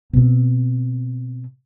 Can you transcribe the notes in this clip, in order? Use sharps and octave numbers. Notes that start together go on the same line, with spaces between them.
B2 C4